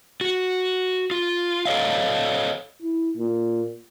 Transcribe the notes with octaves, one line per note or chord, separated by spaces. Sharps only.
F#4
F4
A4 C#5 D#5 F5
E4
A#2